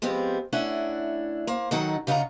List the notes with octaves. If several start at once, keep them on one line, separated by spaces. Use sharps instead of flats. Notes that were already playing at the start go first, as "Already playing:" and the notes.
F3 G#3 B3 C4 G4
A3 C#4 D4 E4 F#5
A#3 C5
D#3 F#3 D#4 A4 F#5
C#3 D#4 F4 F#5 A#5